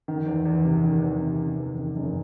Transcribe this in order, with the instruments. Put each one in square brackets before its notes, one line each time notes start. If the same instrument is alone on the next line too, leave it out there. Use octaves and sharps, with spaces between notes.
[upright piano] D#3
E2
E2
C3
D#3
E2
C3
C3
E2
D#3
F#1